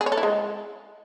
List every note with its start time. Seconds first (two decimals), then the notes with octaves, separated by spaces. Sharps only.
0.01 G#4
0.06 C#5
0.12 A4
0.17 E4
0.23 G#3